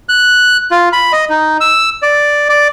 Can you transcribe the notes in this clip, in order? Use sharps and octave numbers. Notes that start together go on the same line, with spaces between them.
F#6
F4
B5
D#5
D#4
E6
D5
D5